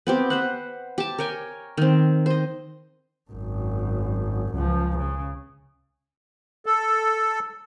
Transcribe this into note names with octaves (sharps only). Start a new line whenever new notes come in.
B3 C4 G4
B4 C5 F#5
G4 A5
A#4 C#5 G5 G#5
D#3 C4
C5 D#5
G#1 F#2
C#2 F3
C#3
A4